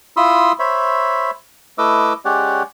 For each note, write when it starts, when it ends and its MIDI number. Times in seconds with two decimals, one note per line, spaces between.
0.17 0.52 64
0.17 0.52 65
0.17 0.52 83
0.17 0.52 84
0.17 0.52 87
0.17 0.52 88
0.59 1.31 72
0.59 1.31 73
0.59 1.31 76
0.59 1.31 83
1.78 2.13 57
1.78 2.13 64
1.78 2.13 71
1.78 2.13 75
1.78 2.13 86
1.78 2.13 88
2.25 2.63 56
2.25 2.63 61
2.25 2.63 67
2.25 2.63 73
2.25 2.63 74
2.25 2.63 78